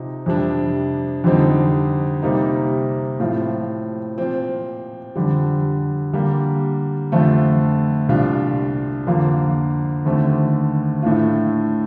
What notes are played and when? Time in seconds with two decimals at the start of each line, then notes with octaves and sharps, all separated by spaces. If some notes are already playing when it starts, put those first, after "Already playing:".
Already playing: C3 F3 D#4
0.26 F2 C3 G3 D4
1.24 F2 D3 G3 C4 D#4
2.22 C3 G3 A#3 D#4
3.20 A2 F3 C4 F4
4.18 A#2 F3 C4
5.16 F2 D3 G3
6.13 D3 G3 A#3
7.12 F2 D3 A3 C4 F4
8.09 C2 A#2 G3 D4 F4
9.07 F2 D3 F3 A#3 F4
10.05 D#2 D3 A3 C4
11.02 A2 A3 D4 F4